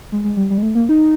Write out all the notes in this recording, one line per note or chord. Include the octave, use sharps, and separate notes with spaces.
G#3
G#3
G3
G3
G#3
A3
A#3
D#4